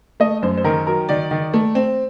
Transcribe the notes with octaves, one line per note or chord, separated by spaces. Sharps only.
A3 D#5
F#2 C5
C5
D#3 A#4
F#3 A#4
D#3 D5
D#3
A3
C4